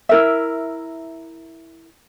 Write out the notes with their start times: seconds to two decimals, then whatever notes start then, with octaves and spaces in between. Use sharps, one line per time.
0.09 E4 A#4 E5